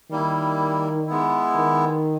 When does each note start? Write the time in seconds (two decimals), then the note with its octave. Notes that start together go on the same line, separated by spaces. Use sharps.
0.11 D#3 G3 A#3 E4
1.07 G#3 B3 E4
1.55 D#3